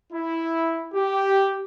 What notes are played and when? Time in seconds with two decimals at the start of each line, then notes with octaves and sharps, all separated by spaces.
0.13 E4
0.94 G4